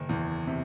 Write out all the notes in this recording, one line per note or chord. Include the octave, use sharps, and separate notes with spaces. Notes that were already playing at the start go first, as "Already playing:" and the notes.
Already playing: F#1 D#3
E2
C3